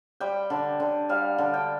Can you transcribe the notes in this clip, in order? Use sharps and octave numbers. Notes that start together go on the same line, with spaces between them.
G3 G5
D3
D3
G3 F5
D3
G5